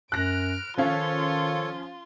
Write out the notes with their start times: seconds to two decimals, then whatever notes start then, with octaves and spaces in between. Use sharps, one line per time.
0.12 F#2 F6 F#6 A#6 D7
0.78 D#3 F3 C#4 F4 A4 C#5 F5 C6